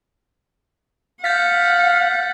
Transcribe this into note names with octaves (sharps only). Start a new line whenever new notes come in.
F5 F#5 G6 A6 B6